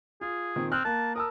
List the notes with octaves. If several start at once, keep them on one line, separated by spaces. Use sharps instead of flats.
F4 G#4
A#2 D#3 C4
C4 F6 F#6
A#3 A5
A#4 A5 D#6 E6